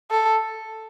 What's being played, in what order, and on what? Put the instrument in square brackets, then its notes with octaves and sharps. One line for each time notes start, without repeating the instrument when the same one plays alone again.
[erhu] A4